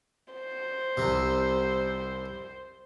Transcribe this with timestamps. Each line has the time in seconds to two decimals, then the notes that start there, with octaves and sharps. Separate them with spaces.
0.33 C5
0.97 C2 C3